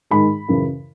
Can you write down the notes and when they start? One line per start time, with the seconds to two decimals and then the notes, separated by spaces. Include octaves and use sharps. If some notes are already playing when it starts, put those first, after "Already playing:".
0.11 G#2 D#3 G#3 B5
0.48 F#2 C#3 E3